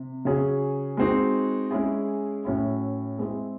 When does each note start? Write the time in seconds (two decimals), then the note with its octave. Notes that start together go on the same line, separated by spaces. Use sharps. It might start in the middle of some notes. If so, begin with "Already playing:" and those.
Already playing: C3
0.25 C#3 F#3 C#4 G#4
0.97 G#3 C4 D#4 F#4
1.71 G#3 C#4 E4 G#4
2.44 A2 F#3 C#4 E4
3.19 G#3 C4 E4 G#4